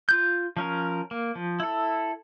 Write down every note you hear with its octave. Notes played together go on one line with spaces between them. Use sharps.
F4 G6
F3 C#4 A#4
A#3
F3
E4 A4